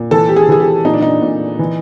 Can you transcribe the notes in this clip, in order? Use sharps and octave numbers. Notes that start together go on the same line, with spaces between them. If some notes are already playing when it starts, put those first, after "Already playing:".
Already playing: A#2
E3 A4
G4
G#4
E3 G#4
G4
A#2 D#4
D4
D#4
A#2
E3